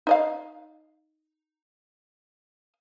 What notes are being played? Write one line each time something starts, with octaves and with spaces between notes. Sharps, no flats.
D#4 D#5 F5